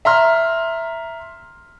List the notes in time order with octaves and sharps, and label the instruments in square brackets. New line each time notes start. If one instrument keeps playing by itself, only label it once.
[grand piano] E5 A#5 C6 F6